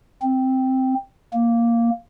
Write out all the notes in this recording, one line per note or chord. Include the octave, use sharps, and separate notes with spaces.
C4
A#3